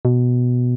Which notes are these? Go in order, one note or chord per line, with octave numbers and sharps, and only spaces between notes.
B2